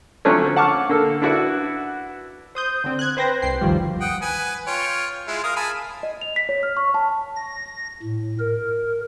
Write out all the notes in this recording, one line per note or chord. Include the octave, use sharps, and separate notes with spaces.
D3 F3 F#3 A3 C4 C#4
F#5 A5 C#6 D6 F6
D3 A#3 A4
D4 E4 F#4 B4 F#5
C5 D#6 G6
D3 C4
F#6 G#6
B4 C5 G5 A#6
C2 G5 C7
G1 D2 D#3 F3 G3
F#5 G5 D#6
B4 G#5
F4 C#5 G5
G#3 E4 F4
A#4 F5 D#6
G#5 A5 B5
D#5
F7
B6
C#5
F6
C#6
A5
A#6
A2
A#4